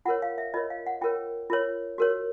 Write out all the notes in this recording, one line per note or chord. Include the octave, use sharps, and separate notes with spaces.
F4 A#4 C#5 F#5
F5
E5
F4 A#4 C#5 D#5
F5
F#5
F4 A#4 C#5 G5
F4 A#4 C#5
F#4 A#4 C#5